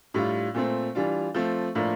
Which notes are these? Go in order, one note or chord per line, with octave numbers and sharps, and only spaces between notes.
A2 G3 D4 F4
A#2 A3 C4
E3 G3 D4 F4
F3 A3 C4
A2 F3 A#3 D4